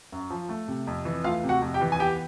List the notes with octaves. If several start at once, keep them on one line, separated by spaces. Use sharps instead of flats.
F#2
F3
A3
C3
F2
E3
A3 F4 F5
C3
F#4 F#5
F2
G4 G5
E3
G#5
B3 G4 G5